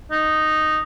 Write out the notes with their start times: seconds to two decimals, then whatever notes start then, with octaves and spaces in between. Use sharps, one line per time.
0.12 D#4